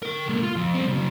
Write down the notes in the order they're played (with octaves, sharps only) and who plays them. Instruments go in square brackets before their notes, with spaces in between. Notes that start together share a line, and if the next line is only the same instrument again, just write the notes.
[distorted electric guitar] A#4 G5
G#3 A#3
F4
F2 F3
G3 C4
C#3 F#3